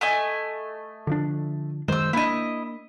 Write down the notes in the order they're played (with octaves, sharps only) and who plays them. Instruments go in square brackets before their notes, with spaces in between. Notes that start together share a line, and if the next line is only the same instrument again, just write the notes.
[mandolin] A3 D#5 G#5
[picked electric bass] D3 F3 D4
[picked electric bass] F#2 D#3 G#3 [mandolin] C5 E6
[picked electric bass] A#3 D4 [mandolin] E4 D#5